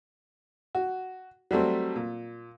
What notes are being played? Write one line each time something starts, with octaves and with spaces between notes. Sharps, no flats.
F#4
F#3 G3 A3 C4
A#2